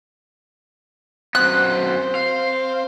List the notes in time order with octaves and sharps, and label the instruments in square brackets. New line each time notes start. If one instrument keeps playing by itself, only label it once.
[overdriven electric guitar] F#2 B3 [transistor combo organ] C4 C5 [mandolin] F#6
[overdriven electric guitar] F5